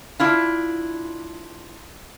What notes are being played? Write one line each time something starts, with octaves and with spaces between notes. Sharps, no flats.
D4 E4 F4